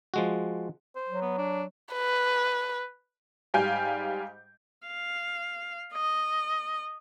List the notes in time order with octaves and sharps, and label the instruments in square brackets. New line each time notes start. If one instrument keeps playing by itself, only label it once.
[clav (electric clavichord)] F3 G#3 F#4
[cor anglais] C5
[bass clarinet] F#3
[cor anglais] B3
D4
[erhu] B4
[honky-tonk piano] G#2 G3 F5 G5 G#5 G6
[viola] F5
D#5